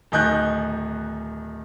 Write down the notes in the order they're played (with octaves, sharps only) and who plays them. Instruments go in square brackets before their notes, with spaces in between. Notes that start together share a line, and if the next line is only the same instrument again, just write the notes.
[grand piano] D1 D#3 D#5 G#5 F#6 G6